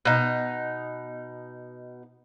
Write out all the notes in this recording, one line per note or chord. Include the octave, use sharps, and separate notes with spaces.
B2 D#4